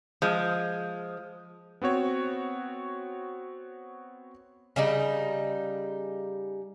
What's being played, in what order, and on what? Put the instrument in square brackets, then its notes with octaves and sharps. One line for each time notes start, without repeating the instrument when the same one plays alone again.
[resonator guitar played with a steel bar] F3 G#3
[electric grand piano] B3 C4 F#4 C#5
[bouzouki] C#3 G3 D#4